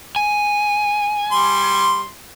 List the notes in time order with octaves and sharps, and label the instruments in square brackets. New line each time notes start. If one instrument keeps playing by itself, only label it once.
[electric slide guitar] G#5
[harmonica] G3 C6